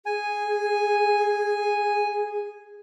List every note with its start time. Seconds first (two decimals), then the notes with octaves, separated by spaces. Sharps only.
0.06 G#4 G#5